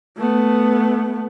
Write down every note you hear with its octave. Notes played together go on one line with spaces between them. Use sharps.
A3 B3